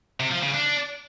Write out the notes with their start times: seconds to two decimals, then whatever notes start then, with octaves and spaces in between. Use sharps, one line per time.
0.20 C3
0.32 F3
0.43 C#3
0.55 D4